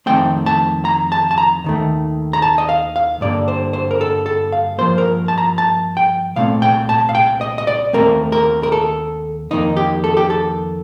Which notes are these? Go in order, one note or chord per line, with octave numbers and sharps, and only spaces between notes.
F2 D#3 A3 C4 G5
A5
A#5
A5
A5
A#5
D#2 D#3 A3
A#5
A5
D#5
F5
F5
G2 D3 G3 A#3 D5
C5
C5
A#4
A4
A4
F5
G2 F3 A#3 C5
A#4
A5
A#5
A5
G5
C2 A#2 A3 C4 F5
G5
A5
F5
G5
D#5
D#5
D5
D#2 D#3 A3 C4 A#4
A#4
A#4
A4
F2 D#3 A#3 D#4
G4
A4
G4
A4